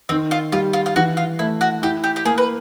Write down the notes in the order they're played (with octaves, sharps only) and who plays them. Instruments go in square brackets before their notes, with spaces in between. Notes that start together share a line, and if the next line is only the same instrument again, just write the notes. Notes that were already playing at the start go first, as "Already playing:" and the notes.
[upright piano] D#3 [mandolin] C4
[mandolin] F4
[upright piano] G3 [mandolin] F4
[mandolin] F4
F4
[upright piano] E3 [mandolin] F#4
[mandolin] F4
[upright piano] A3 [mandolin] E4
[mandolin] F#4
[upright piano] E4 [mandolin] G4
[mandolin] G4
G4
[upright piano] A#3 [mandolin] G#4
[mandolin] B4